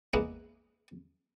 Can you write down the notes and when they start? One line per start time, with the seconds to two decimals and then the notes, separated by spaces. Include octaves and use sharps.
0.13 E2 G#3 A#3 B3 E5 F#5